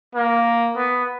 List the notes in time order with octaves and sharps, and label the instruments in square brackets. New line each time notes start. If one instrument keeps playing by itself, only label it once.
[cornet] A#3
B3